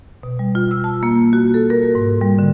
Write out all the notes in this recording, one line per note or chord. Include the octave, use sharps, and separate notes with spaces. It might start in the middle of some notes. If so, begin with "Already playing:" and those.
B2
G3
F4
E6
A5
A#3
F#4
A4
A#4
G#2
G3
D3